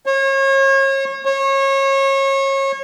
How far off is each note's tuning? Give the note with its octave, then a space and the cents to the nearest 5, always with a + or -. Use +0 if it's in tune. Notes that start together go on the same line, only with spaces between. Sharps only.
C#5 -35
C#5 -30